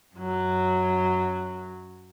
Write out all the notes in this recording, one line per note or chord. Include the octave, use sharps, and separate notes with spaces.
F#2 F#3